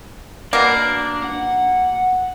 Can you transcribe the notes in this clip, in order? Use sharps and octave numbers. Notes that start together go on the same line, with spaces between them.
B2 A#3 D4
F#5